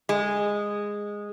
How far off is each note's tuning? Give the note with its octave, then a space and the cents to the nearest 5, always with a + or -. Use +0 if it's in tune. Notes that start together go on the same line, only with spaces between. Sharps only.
G#3 -10